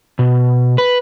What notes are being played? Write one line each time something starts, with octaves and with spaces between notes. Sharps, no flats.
B2
B4